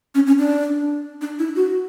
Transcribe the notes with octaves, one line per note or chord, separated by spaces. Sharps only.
C#4
C#4
D4
D4
E4
F#4